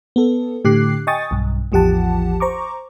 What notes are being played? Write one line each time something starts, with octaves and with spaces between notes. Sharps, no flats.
B3 A4
A2 D3 G4 D6 F#6 C7
D#5 G5 G#5 C#6 D#6 A6
B1 G2
A1 E2 F3 G4 F#5 A5
C5 A#5 C#6 D6